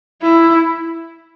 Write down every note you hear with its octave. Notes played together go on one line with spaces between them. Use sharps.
E4